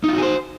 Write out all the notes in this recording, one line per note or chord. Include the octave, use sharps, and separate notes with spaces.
D#4 F4 F#4 G#4 C5